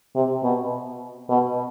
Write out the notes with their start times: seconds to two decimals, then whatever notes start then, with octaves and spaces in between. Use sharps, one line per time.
0.15 C3
0.44 B2
1.30 B2